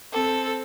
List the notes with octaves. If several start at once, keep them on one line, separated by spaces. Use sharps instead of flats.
C4 A4